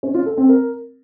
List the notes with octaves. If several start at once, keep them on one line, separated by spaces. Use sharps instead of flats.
C#4
F4
A4
C4
A#4